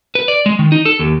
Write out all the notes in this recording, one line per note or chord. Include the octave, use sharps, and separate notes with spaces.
B4
D5
G#3
D#3
D#4
A4
D#2